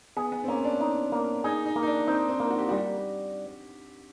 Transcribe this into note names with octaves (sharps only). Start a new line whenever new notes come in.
B3 G#4
B3
C4
A#3 C#4
D4
D#4
A#3
D#4 G#4
D#4
A#3
D#4
D4
C4 D#4
C4
A#3
F#4
G4
G3 F#4
G4